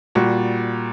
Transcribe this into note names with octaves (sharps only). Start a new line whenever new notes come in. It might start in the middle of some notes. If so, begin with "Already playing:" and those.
A#2 G3 F#4